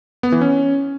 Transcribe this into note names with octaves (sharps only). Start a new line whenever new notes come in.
B3
E3
C#4